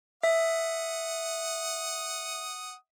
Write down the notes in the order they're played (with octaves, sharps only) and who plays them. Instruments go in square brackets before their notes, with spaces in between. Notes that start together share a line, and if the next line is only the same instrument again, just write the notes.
[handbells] E5 [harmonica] F#5 D#6